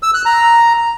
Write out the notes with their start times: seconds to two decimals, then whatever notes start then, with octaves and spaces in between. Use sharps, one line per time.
0.03 E6
0.14 F#6
0.25 A#5